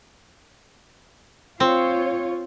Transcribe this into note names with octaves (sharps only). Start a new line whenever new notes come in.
C4 F4 C#5